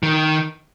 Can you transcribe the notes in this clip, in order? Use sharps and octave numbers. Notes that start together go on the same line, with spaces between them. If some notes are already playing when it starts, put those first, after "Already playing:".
D#3